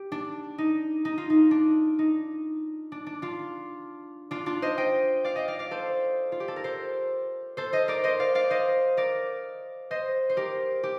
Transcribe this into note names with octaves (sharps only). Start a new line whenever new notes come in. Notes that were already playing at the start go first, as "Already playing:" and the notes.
Already playing: G4
D4
D#4
D#4
F4
D#4
D4
D#4
D4
D4
D4 F4
D4 F4
D4 F4
C5 D#5
D#5 G5
D5 F5
D#5 G5
D5 F5
D5 F5
A4 C5
F4
G4
A4
A#4
A4 C5
A4 C5
C5 D#5
A#4 D5
C5 D#5
D5 F5
D5 F5
C5 D#5
A#4 D5
C5 D#5
C5
G4 A#4
G4